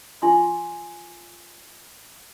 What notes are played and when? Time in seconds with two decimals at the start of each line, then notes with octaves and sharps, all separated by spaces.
0.22 F4 G#5 C6 C#6